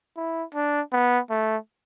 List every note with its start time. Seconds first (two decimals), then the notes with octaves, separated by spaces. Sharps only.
0.17 E4
0.55 D4
0.93 B3
1.30 A3